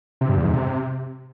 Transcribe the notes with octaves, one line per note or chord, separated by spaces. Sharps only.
C3
G2
E2
G#2
C3